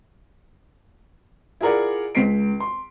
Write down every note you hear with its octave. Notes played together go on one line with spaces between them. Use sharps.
E4 F4 G#4 A#4 D5 F#5
C#2 B6 C7 D7
C6